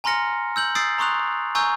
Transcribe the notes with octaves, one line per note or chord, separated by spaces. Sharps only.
G#5 A#5 C6 F6 A#6 C#7
E6 G6 F#7
D#6 E6 G6 A6 C7 D7
A#5 C6 C#6 D#6 F#6 F7
G#5 A#5 C#6 E6 G6